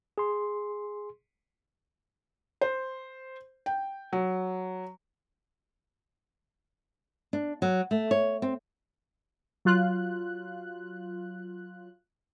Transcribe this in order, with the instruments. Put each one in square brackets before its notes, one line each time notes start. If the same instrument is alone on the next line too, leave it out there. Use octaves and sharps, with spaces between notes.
[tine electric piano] G#4 C6
[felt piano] C5
G5
F#3
[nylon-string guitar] D4
F#3
A3
C#5
C4
[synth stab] F#3 F4 F#6